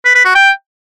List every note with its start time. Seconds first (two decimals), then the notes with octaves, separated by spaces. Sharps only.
0.05 B4
0.15 B4
0.25 F#4
0.35 G5